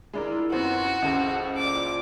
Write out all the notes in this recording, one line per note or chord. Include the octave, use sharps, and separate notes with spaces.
G#3 D4 E4 F4 A#4
F#2 B3 C4 F#4
C#2 C#3 A4 C5
A#2 D6